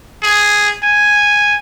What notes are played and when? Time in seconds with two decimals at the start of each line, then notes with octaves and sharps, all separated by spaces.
0.23 G#4
0.83 G#5